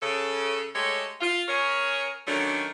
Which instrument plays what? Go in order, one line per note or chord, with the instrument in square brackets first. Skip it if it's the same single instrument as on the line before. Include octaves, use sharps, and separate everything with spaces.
[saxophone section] C#3 A4
G#3 A3 G4 A4 C#5
F4
C#4 G#4 A#4 C#5
D3 D#3 F#3 A3 C#4 D4